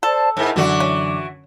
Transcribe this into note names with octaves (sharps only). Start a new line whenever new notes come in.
A4 C5 D5 A5
G#2 E4 A#4 G#5
F#2 D3 E3 F#4 D6
C#4